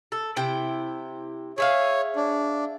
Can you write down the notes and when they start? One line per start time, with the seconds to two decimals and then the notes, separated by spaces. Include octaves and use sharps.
0.12 A4
0.36 C3 E4 G5
1.58 G#4 C#5 E5 F5
2.16 D4